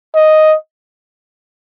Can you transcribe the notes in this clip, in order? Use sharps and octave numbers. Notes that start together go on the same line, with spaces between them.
D#5